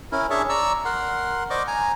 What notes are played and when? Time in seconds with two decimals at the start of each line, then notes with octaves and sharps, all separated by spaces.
0.12 C#4 E4 A#4
0.30 D4 G#4 C#5 E5 A5 C#6
0.49 D5 A#5 C#6 E6
0.85 A#4 F#5 C6
1.50 C5 D5 D#5 C#6 D6
1.67 G#5 A#5